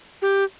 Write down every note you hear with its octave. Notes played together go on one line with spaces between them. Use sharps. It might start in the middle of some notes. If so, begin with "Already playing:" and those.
G4